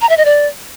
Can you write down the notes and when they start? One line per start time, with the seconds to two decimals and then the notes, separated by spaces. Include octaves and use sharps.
0.01 A#5
0.09 E5
0.17 D#5
0.25 D5